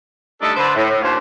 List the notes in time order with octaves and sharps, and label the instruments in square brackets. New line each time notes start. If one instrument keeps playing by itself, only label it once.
[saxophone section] G3 A3 D4 D#4 A4
D3 B4 C5
A2
D#2 A#2 F3 D4 C5 C#5